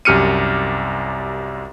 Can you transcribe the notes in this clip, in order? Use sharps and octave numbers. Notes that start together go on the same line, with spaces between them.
C2 F#2 G4 F6 C#7 D#7